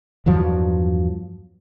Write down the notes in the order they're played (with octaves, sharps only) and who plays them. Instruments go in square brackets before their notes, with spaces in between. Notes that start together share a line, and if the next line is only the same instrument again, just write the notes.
[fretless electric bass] E2 G2 F3 F#3